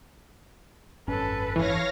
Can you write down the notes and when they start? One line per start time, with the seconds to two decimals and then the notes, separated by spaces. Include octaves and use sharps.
1.08 G#1 F#2 C#4 A4 B4
1.56 E3 C#5 F5 A#6